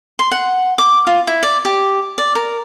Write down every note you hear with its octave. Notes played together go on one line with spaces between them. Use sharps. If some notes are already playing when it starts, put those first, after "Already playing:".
C6
F#5
D6
F4
E4
D5
G4
D5
A#4